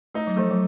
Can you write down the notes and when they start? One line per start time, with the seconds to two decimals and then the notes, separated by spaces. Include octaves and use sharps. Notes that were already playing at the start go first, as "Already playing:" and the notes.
0.14 A3 D#4
0.27 F#3
0.36 F3 A3
0.51 F#3